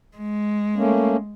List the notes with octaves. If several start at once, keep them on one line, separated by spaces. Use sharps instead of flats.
G#3
A3 A#3 C#4